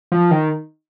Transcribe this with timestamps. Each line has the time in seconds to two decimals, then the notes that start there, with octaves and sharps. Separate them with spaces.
0.12 F3
0.31 D#3